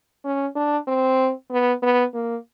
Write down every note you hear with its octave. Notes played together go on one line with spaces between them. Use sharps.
C#4
D4
C4
B3
B3
A#3